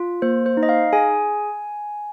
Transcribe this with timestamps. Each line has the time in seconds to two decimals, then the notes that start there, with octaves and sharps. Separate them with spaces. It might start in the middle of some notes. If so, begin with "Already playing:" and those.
Already playing: F4
0.22 A#3 C5
0.46 C5
0.57 D#4
0.63 D#5
0.69 F5
0.93 G#4 G#5